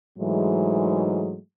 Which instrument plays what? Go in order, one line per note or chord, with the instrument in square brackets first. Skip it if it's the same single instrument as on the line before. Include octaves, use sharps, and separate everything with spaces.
[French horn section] G#2 E3 F#3 G#3 A3